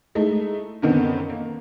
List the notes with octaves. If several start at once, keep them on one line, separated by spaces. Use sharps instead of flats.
G#3 A3 D#4 E4
F#2 A#2 D3 D#3 B3 C4
A#3